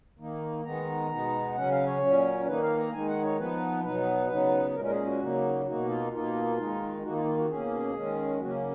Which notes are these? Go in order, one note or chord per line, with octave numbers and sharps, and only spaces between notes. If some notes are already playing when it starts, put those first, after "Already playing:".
D#3 A#3 D#4
D#3 G#3 B3 D#4 A#5
B2 G#3 B3 D#4
C#3 F#3 C#4 F#5
F5
C#5
A#2 F#3 C#4
D#3 A#3 D#4 B4
F5
A#5
D#3 G#3 D#4 G#5
F#5
C#5
F3 B3 D#4 B4
B2 F#3 B3 D#4 B4
C#3 F#3 B3 D#4
A#2 G#3 C#4 A#4
A#4
G#4
F#4
C#3 F#3 A#3 D#4
B2 A#3 D#4 F#4
F4
B2 A#3 D#4 F4
D#3 G#3 D#4
D#3 A#3 D#4 F#4
F4
F4
F#4
B2 A#3 C#4 G#4
D#3 G#3 C#4
C#3 F#3 A#3 C#4 F#4